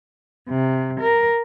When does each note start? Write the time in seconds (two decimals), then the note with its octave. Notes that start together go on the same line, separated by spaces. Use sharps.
0.49 C3
1.00 A#4